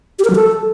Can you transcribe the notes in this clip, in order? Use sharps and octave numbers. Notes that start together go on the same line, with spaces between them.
G4
A#4
F#3
A4